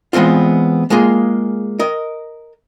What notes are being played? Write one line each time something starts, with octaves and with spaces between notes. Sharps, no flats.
E3 G#3 B3 C4 F4
G#3 A#3 F4 G#4
A#4 D#5